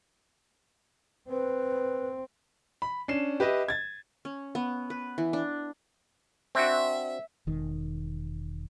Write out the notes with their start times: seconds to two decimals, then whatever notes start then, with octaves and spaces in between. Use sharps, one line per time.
1.30 C4 B4
2.82 B5
3.08 C#4 D4 C7 E7
3.40 G4 B4 D#5 E5
3.68 G#6 A6
4.25 C#4
4.55 B3
4.90 B4
5.18 E3
5.33 D4
6.55 C4 D4 F#4 E5
7.47 E1 D#3